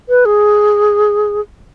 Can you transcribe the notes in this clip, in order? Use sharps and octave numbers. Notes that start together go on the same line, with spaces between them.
B4
G#4